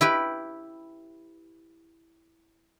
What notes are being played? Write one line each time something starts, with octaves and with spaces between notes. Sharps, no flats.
E4 G4 B4